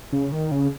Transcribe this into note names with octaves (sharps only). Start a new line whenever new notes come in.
C#3
D#3
C#3